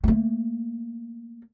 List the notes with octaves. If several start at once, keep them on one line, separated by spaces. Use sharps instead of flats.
A3 A#3